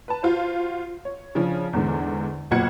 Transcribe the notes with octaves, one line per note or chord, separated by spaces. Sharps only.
B4 A5
F4 F#4 C5
C#5
C#3 F3 C#4 D4
E2 G#2 D3
F#1 B1 A#2 F#5 G#6 C#7